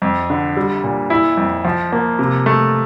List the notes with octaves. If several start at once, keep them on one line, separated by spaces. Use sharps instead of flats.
F2
D3
G3
A#2
E4
F2
F3
A#3
C3
A3